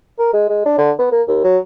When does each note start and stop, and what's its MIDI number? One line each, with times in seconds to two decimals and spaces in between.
0.19 0.31 70
0.33 0.46 56
0.49 0.64 56
0.65 0.77 62
0.78 0.90 50
0.98 1.09 59
1.11 1.22 58
1.27 1.41 39
1.44 1.57 54